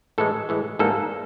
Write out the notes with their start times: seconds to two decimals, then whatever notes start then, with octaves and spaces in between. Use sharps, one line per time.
0.18 A2 E3 G#3 A4
0.49 A2 E3 G#3
0.79 G#2 E3 G3 A#3 A4